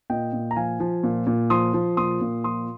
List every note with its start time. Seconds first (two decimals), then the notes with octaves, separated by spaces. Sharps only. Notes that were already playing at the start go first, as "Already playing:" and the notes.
0.10 A#2 D#5 G5
0.33 A#2
0.51 A#5
0.56 F3 F5 G#5
0.80 F3
1.03 A#2
1.27 A#2
1.50 F3 C6 D#6
1.74 F3
1.97 A#2 C6 D#6
2.21 A#2
2.44 F3 C6 D#6